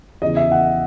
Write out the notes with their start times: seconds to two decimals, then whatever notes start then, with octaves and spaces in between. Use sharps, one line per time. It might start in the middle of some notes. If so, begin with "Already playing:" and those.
0.22 E2 C#3 E3 D#5
0.37 E5
0.52 F#5